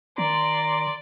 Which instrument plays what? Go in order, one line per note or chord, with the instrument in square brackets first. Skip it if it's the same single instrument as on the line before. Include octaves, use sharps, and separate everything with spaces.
[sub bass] D#3 [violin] D5 [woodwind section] A#5 C6